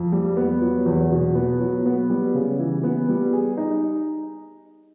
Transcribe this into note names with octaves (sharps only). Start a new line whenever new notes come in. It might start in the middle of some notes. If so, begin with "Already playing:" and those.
Already playing: F2
G3
B3
F#3
E2
B2
B3
F#3
B3
G3
C#3
E3
B3
G3
G#4
D#4